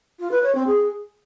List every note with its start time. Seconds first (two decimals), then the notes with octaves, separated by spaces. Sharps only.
0.20 F4
0.31 B4
0.43 C#5
0.55 C4
0.67 G#4